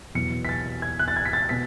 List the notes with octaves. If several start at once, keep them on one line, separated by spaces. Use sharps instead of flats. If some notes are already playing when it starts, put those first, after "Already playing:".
E2 B2 F#3 C#7
B6
A6
G#6
F#6
A6
G#6
B6
A6
B2 B6